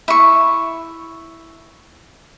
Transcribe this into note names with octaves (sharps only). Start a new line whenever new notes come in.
E4 C#6